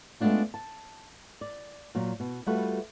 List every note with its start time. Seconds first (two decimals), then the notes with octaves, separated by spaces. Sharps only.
0.20 G#3 A3 B3 C4 D4 F4
0.54 A5
1.41 D5
1.95 A#2 F#3
2.20 B2
2.46 G3 A3 F4 F#4 A4 B4